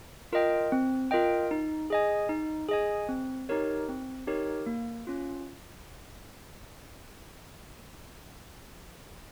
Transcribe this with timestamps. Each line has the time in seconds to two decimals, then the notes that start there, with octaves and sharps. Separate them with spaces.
0.33 F4 A#4 D#5 G5
0.72 C4
1.11 F4 A#4 D#5 G5
1.51 D#4
1.90 G#4 D#5 G#5
2.29 D#4
2.69 G#4 D#5 G#5
3.09 C4
3.49 D#4 G4 A#4 C#5
3.89 C4
4.27 D#4 G4 A#4 C#5
4.66 A#3
5.07 C#4 F4